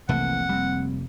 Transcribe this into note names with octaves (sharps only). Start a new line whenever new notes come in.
F1 C2 C3 E3 A3 A#3 F#5
G3 C4